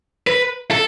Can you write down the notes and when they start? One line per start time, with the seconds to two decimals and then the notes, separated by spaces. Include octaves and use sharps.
0.27 B4
0.71 A4